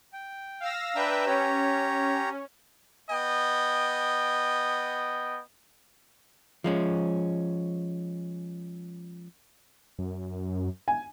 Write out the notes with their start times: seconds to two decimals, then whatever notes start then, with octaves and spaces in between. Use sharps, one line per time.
0.13 G5
0.60 F5 E6 A#6
0.95 D4 B4 E5 G5 A#5 E6
1.26 C#4 G4 C#5 A#5
3.11 B3 D#5 G5
6.64 F3 G#3 C#4
9.99 F#2
10.88 G#5